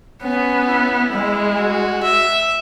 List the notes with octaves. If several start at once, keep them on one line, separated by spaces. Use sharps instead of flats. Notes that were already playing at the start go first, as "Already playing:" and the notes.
B3 C#4
E4
G#3
F#4
E5